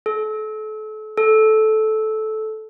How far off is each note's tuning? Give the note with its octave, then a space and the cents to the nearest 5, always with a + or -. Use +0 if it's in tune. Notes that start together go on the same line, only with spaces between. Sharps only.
A4 -35
A4 -15